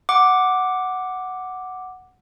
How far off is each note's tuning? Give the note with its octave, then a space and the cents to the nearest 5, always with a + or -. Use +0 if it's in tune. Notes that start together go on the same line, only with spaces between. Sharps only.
F#5 +0 D6 +0